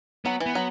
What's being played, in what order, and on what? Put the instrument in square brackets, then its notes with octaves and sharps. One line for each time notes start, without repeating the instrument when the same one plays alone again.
[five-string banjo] F#3 [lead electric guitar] B3
[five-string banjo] E3
[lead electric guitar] B3
[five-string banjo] F#3